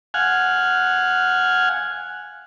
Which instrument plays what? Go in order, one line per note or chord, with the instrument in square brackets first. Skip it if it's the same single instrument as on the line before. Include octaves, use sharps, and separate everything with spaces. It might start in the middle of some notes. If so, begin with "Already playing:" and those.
[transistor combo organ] F5 F#5 G#5